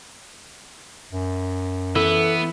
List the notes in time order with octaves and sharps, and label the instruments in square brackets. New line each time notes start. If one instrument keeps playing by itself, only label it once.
[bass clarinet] F#2
[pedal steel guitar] E3 E4 E5 [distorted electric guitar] B3 [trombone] A4